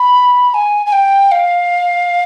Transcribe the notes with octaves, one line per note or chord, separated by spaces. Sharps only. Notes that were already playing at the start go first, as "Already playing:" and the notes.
Already playing: B5
G#5
G#5
G5
F5